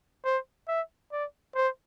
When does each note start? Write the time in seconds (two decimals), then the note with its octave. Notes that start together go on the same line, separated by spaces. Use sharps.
0.25 C5
0.68 E5
1.12 D5
1.55 C5